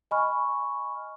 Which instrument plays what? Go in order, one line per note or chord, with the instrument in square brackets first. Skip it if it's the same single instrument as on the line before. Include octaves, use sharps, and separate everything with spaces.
[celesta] D#5 G#5 B5 C#6 F6